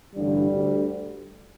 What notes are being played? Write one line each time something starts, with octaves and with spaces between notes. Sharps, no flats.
A1 G2 D3 G3
D2 D3